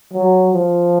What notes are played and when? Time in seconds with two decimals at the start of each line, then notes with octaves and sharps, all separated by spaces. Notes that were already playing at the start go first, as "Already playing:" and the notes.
0.13 F#3
0.53 F3